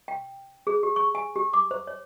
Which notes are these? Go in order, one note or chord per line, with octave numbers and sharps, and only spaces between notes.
G5
G#4
G4
C#6
G#5
G4
D6
C5
C#5